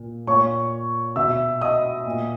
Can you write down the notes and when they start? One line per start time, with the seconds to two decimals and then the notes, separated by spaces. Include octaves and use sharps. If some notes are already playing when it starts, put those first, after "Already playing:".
Already playing: A#2
0.27 A#2 C#5 C#6
1.16 B2 E5 E6
1.61 D#5 D#6
2.06 A#2